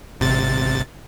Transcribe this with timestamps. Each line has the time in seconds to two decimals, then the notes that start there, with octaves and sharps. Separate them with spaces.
0.20 G#1 C3 A6